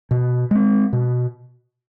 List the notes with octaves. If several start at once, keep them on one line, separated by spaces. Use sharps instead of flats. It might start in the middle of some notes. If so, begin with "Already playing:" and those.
B2
G#3 C4
B2